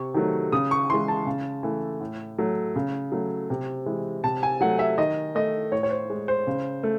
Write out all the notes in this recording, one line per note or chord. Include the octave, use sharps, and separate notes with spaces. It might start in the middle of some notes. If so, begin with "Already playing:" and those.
Already playing: C3 C#6
D#3 F#3 A3
C#3 D#6
C#6
E3 G#3 C6
A5
C#3
E3 A3
A2
F#3 A3
C#3
F#3 A3
C3
E3 G#3
C3 A5
G#5
F#3 A3 F#5
E5
D#3 D#5
A3 D#5
A2 C#5
C#5
C5
G#3
C5
C#3
A3